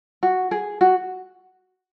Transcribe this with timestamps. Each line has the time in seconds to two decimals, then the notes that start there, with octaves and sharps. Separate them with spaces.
0.23 F#4
0.51 G#4
0.81 F#4